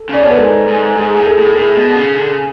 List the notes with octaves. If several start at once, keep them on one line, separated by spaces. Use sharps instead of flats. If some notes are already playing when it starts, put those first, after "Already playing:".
Already playing: A4
C#3 D5
B2 C#5
B4
G#2 A4
G#2
G#2 G#4
A2 G#4
A4
A2
G#4
A2 A4
B2
C#3
D3
C#3